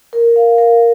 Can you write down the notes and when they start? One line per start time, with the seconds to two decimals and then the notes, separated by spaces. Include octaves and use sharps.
0.13 A#4
0.36 F5
0.58 A#4